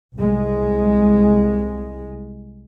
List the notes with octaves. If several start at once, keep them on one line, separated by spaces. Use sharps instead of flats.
C2 G#3